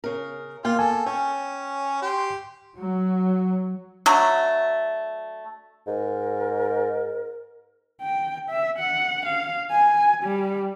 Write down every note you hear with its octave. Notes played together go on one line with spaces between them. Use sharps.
C#3 A#4
A#3 F4 G5
A4 G#5
C#4 G5
G4 C6
F#3
D3 F#3 A3
G#2 A#4
G5
E5
F#5
F5
G#5
G3